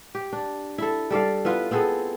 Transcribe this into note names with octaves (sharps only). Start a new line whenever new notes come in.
G4
D4
E4 A4
G3 A4 D5 F5
B3 E4 F4 B4
B3 C4 G#4 A4